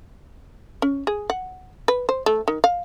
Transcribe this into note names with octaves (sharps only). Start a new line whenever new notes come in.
C#4
G#4
F#5
B4
C5
A3
D#3
F5